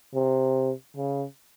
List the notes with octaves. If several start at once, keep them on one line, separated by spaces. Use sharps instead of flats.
C3
C#3